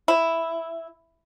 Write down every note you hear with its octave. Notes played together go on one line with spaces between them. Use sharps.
E4